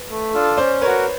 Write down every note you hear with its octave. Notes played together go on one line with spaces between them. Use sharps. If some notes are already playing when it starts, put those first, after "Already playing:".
Already playing: B4
A3
D4 F4 A4
C#4 C5 D5
F#4 A#4 B4 C#5